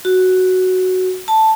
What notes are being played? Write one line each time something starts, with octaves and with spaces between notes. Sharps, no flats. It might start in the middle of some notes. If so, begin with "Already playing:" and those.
F#4
A5